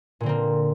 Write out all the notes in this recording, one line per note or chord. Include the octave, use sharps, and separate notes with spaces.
A#2 D3 A#3 C4